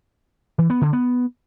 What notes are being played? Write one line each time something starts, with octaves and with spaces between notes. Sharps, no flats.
E3
B3
D3
B3